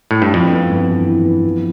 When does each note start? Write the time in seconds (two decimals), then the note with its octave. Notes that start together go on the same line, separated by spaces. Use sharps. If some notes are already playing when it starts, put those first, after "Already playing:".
0.11 A2
0.22 G2
0.33 F2 E4
0.52 B3
0.70 G2
0.89 E3
1.08 E4
1.26 B3
1.43 F3